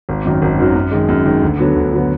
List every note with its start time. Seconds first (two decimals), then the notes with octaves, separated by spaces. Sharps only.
0.09 G#1
0.25 F#2 D#3 F#3
0.42 G#1
0.59 F#2 D#3 F#3
0.75 F#2
0.91 D#3 G#3
1.08 F#2
1.26 D#3 G#3
1.42 D2
1.59 D3 F#3 B3
1.76 D2
1.93 D3 F#3 B3